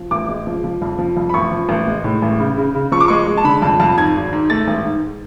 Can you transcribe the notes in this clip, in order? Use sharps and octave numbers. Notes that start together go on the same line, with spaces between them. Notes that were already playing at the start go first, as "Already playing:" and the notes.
Already playing: F3
A1 D6
G#3
F3
F3
F2
F3
F2
B5
A1 C#6
F3
A1
G#3
A2
A1
C#3
C#3
C#3
F3 C#6
D6
G#3 C#6
G#3
A5
D3 B5
F2 A5
F2 A5
G#2 G#6
G#1
G#2
A3 A6
A1
G#2